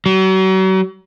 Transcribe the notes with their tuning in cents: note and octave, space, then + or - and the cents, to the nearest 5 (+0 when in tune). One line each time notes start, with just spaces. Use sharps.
F#3 +40